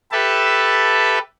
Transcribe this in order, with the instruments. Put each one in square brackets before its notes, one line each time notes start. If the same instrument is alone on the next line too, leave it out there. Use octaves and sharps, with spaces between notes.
[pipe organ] G4 A4 B4 E5 A5